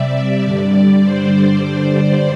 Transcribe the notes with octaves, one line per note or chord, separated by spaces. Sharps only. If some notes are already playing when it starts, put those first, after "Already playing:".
Already playing: C3 G3 D5 E5
G2 D3 G3
C5